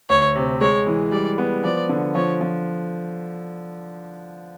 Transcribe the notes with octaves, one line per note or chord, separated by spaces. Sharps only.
D2 C#5
C3
G#3 C#5
E3
G3 D5
B3
F3 D5
D3
F3 C#5
F3